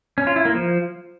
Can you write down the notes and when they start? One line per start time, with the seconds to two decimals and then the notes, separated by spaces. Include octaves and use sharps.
0.18 C#4
0.27 F4
0.36 E4
0.45 A#3
0.54 F3